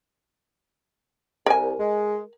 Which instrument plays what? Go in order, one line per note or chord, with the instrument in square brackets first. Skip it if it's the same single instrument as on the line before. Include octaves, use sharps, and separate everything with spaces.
[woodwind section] C2 [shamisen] A#4 G#5
[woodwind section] G#3